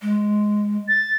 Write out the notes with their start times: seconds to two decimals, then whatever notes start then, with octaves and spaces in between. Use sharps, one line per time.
0.02 G#3
0.88 A6